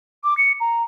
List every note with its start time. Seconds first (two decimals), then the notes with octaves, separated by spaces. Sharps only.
0.24 D6
0.38 C#7
0.60 A#5